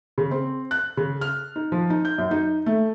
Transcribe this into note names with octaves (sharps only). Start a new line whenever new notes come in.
C#3
C4
F#6
C#3
F6
D#4
F3
D#4
G6
F#2
D#4
A3